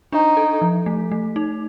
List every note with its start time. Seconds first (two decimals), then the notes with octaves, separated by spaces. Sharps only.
0.12 D4 D#4
0.37 A4
0.62 F3
0.86 A3
1.12 A3
1.36 D#4